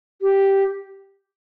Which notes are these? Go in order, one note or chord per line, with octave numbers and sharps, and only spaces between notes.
G4